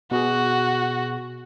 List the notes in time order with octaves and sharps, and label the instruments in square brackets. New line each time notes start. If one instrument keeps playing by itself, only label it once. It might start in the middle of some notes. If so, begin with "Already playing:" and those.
[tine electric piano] B2 G#4 [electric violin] F#4